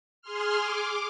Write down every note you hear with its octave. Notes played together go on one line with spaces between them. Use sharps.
G#4 C6 F6
D6